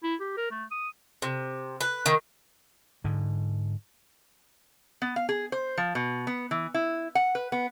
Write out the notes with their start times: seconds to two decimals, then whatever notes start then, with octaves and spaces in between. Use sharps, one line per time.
0.03 E4
0.20 G4
0.37 A#4
0.51 A3
0.71 D#6
1.22 C3
1.80 B4
2.06 D#3
3.04 G#2 D3
5.02 B3
5.16 F5
5.29 G#4
5.52 C5
5.78 F3
5.95 B2
6.27 B3
6.51 E3
6.74 E4
7.15 F#5
7.35 B4
7.52 B3